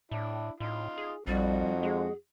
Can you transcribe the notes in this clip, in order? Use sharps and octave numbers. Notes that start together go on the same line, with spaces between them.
A2 D4 E4
A2 D#4 F4
G#4
A#1 F2 G3 D#4 F#4
G#3 G#4